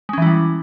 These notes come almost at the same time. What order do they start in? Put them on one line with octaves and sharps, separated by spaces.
G#3 C#4 E3 E4 G3